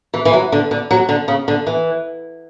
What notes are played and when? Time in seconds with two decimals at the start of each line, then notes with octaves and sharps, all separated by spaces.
0.14 E3
0.25 E3
0.33 F#3
0.52 D3
0.71 D3
0.91 F#3
1.09 D3
1.28 C#3
1.48 D3
1.67 E3